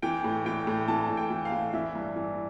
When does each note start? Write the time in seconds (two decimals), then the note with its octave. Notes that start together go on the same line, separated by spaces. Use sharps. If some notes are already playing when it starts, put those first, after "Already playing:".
0.02 E3 G5
0.24 A2
0.45 E3 G5
0.67 A2
0.88 E3 A5
1.09 A2
1.17 G5
1.30 E3
1.45 F5
1.52 A2
1.74 E3 E5
1.95 G2
2.16 E3